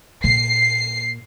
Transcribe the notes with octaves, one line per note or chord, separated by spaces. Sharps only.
A#2 C7